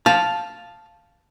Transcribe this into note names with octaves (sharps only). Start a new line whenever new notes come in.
F5 A5